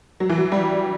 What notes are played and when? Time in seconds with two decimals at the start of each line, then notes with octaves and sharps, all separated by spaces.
0.20 F#3
0.30 E3
0.38 F#3
0.52 G3